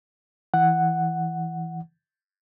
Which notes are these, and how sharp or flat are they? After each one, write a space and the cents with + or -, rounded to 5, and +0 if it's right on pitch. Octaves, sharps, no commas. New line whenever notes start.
E3 +0 F#5 +0